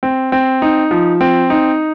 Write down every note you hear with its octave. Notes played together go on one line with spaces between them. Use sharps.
C4
C4
D#4
F3
C4
D#4